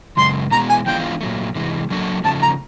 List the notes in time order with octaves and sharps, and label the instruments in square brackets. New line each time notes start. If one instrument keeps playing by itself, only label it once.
[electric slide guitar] F#2 C#3 G#3 [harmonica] C6
[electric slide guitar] B2 G#3 B3 E4 G#4 [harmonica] A#5
[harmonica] G#5
[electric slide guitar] E3 G#3 B3 D4 F4 [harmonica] G5
[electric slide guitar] A#2 F#3 A3
C3 E3 G#3
F#3 A#3 D4 F#4 A4
[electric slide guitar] C#3 F3 A3 [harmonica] A5
[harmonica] A#5